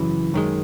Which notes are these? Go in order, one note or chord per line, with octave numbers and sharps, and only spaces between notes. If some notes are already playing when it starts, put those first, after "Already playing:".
Already playing: F#2 C#3 E3
F#2 D#3 G#3